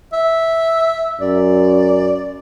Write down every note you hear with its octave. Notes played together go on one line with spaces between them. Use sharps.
E5
F#2 D5